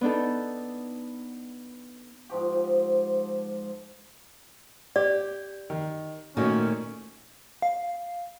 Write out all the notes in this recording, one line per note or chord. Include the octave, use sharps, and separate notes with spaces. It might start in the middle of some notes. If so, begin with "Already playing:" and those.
B3 D4 D#4 A4
G#2 F3 G4
G4 D5
D#3
A#2 D#3 A3 C#4 F#4
F5